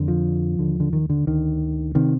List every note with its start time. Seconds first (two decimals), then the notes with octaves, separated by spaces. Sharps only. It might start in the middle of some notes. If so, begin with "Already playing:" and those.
Already playing: F2 D3
0.08 F3
0.59 D#2 D3
0.80 D3
0.93 D#3
1.10 D3
1.27 D2 D3 D#3
1.95 C3 D#3